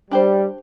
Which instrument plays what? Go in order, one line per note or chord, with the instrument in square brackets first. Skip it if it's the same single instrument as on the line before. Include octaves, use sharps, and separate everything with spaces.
[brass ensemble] G3 [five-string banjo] D4 G4 C5